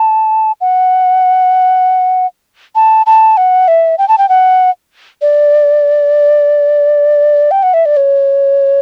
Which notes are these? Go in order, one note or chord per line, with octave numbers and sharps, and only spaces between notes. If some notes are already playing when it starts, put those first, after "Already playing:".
Already playing: A5
F#5
A5
A5
F#5
E5
G5
A5
G5
F#5
D5
G5
F#5
E5
D5
C#5